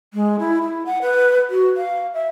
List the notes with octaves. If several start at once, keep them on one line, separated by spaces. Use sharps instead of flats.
G#3
E4
E4
F#5
B4
F#4
F5
E5